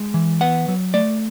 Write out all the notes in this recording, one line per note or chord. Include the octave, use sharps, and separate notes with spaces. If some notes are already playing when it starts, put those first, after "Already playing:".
Already playing: G#3
E3
B3 F#5
F#3
A3 D5